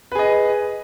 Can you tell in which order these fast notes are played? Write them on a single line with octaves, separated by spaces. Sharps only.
B4 G#4 D#5